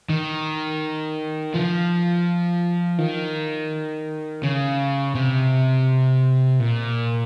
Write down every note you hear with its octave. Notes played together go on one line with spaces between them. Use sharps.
D#3
F3
D#3
C#3
C3
A#2